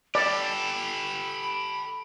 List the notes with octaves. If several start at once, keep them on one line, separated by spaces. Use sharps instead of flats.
G4 A4 D5 B5